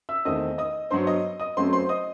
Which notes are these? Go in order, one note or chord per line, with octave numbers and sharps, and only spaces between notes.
E5 E6
E2 D#3 A3 C4 D#5 D#6
D#5 D#6
G2 F#3 B3 C5 C6
D#5 D#6
D#5 D#6
F#2 F#3 A3 C4 C5 C6
C5 C6
D#5 D#6